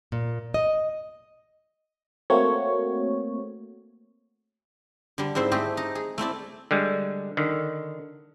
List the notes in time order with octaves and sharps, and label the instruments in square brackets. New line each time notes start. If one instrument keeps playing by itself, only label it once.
[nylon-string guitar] A#2
D#5
[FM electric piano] A3 A#3 C4 F#4 C#5
[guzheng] D3 G3
G#2 C4 E4 C5
A3 C4 G4 G#4
D#4
G#4
A3 C4 E4 D5
[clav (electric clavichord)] D3 G3 G#3
D3 D#3